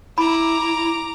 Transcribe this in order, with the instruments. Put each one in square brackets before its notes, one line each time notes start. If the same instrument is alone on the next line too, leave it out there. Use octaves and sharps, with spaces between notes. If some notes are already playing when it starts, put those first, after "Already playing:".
[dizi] E4 [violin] A#5 D6 [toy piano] B5